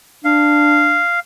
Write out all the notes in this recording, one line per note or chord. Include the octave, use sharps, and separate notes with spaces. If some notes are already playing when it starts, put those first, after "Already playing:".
D4 F5